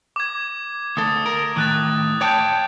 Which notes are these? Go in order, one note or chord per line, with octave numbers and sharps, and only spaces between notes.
D6 G#6
D2 A4 D#6
A#4
A2 D#3 D6 F#6 A6
C#5 G5 A5 D6 G6